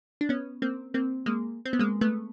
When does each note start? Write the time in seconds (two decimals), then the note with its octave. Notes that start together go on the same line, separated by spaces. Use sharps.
0.21 D4
0.29 B3 C#4
0.62 A#3 C4
0.94 A#3 C4
1.26 G#3 A#3
1.65 C4
1.73 B3
1.79 G#3 A#3
2.01 A3 B3